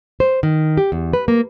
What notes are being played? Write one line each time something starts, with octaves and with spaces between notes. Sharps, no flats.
C5
D#3
G4
E2
B4
A#3